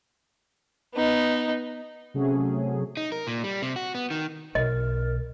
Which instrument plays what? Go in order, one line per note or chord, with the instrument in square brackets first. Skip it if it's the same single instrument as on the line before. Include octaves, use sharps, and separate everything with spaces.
[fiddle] B3 D#4
[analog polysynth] C3 F#3 A3 C#4 G#4
[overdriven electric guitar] D#4
A#4
A#2
G3
C3
F#4
B3
D#3
[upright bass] B1 [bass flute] A#4 [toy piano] D#5